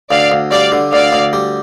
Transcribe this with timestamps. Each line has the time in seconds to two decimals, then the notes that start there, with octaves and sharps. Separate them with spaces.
0.11 D2 D5 F5
0.32 D2
0.51 G3 D5 F5
0.72 D3
0.92 D2 D5 F5
1.13 D2
1.33 G3